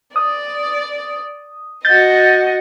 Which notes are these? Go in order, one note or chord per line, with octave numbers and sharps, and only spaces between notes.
D5 D#6
F#4 D#5 G6 A6